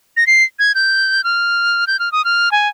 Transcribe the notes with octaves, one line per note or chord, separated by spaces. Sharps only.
A#6
C7
G#6
G6
F6
G6
F6
D#6
F6
G#5